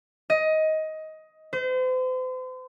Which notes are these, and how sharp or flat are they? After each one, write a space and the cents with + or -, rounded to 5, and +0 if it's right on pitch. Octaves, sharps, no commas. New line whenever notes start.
D#5 +15
C5 -40